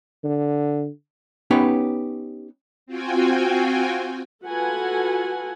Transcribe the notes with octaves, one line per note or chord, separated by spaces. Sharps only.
D3
B3 C#4 D#4 G4 B4 C#5
C4 F4 F#4 G5 G#5
F4 F#4 A4 B4 F#5 G#5